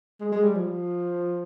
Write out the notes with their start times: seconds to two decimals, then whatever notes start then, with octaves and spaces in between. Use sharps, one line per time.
0.21 G#3
0.32 G#3
0.44 G3
0.55 F3